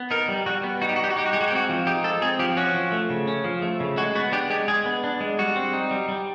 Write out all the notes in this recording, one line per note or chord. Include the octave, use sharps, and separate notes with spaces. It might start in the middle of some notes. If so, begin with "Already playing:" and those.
Already playing: B3
D#4 A#4
G3
G3 F#4
B3
D#4 F#4
G4
F#4
G3 G4
F#4
D#4 G4
F#4
G#3 G4
F#4
G4
C4 F#4
F3
D#4 G4
G#3 A4
C4 G#4
F3 G4
C#4 F#4
F3
A3
C#3
C#4
F3
A3
C#3
G#3 F#4
B3 F#4
D4 G4
G#3 G4
G#3 G#4
B3
D4
G#3
G3 F#4
C4
D#4
G3
G3